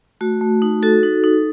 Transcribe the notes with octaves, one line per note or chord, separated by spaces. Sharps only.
A3 F#4
A3
D#4
F#4 A4
D#4
D#4